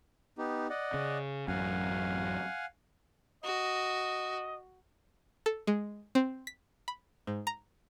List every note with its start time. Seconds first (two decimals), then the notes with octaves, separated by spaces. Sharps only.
0.38 B3 D#4 G4
0.70 D5 D#5 F#5
0.94 C#3
1.48 A1 F#2 F5 F#5 G#5
3.44 F#4 D#5
5.46 A4
5.67 G#3
6.15 C4
6.47 B6
6.88 B5
7.27 G#2
7.47 A#5